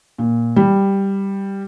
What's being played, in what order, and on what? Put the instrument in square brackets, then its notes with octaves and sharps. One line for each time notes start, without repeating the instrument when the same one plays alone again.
[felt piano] A#2
G3